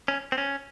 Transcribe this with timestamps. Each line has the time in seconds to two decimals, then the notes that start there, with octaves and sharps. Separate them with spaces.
0.08 C#4
0.32 C4
0.38 C#4